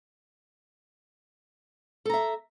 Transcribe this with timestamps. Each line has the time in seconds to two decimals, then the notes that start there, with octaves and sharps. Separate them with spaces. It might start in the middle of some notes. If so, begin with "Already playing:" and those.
2.05 A4
2.10 A#5
2.14 E5